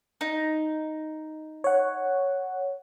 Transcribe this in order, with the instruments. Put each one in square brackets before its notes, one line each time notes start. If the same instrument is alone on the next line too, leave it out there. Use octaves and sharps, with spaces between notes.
[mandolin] D#4
[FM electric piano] C#5 F#5